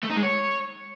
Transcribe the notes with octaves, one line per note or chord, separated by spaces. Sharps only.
A3
D#4
G#3
C#5